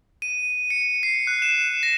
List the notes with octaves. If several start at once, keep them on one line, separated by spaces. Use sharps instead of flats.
D#7
C#7
C7
F#6
E7
A#6